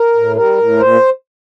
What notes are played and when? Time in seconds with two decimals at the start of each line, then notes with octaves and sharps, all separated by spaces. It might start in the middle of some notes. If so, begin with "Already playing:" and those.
Already playing: A#4
0.15 A2
0.36 G3 A#4
0.58 A2
0.80 A#2 C5